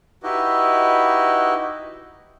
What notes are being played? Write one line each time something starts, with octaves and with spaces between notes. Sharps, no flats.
D#4 E4 F#4 G4 B4 D#5